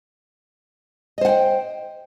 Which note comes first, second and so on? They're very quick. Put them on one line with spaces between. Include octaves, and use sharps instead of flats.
D#5 C5 F#5 G5